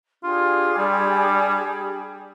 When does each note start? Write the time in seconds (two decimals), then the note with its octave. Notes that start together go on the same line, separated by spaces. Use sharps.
0.23 D4 F4 G4 G#4
0.78 G3